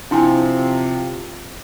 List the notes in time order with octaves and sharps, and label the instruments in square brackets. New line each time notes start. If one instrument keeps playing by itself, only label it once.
[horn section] C3 F3 [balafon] D4 E4 G#5